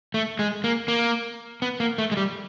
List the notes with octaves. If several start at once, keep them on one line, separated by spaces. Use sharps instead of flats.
A3
G#3
A#3
A#3
B3
A#3
A3
G#3
G3